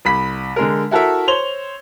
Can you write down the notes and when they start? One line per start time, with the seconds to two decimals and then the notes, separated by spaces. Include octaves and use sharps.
0.05 C2 B5 B6
0.56 D3 G#3 A#4
0.91 E4 F#4 A4 A#4 E5
1.28 C5 C#5 F7 G7